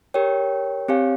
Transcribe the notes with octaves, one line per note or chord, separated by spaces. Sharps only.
G4 A#4 C#5 G5
C4 G4 C#5 F5 G#5